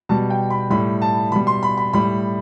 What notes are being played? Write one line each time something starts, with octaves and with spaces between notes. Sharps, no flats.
B2 G3 A5
G5
B5
A2 G3 B5
A5
B2 G3 B5
C6
B5
B5
A2 G3 B5